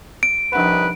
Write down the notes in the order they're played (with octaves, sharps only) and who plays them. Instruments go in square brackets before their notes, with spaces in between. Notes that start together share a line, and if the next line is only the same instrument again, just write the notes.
[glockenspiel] D7
[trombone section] C2 D#4 B4 [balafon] F3 D4 F#5